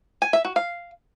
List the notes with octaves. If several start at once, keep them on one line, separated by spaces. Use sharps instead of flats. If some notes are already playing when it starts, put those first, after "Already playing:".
G#5
E5
F#4
F5